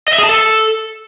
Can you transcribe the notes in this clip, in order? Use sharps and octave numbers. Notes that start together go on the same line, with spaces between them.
D#5
E5
G#4
A5
A4